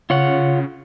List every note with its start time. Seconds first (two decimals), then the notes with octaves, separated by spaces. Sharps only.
0.10 C#3 F4 C#5 F#5